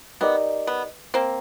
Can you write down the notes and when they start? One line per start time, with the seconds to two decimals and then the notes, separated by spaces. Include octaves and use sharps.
0.21 B3 D#4 G4 A#4 D5
0.67 B3
1.14 A#3 C4